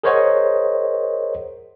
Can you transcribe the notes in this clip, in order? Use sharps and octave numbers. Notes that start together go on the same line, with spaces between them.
G#4 A#4 C5 C#5 D#5 F#5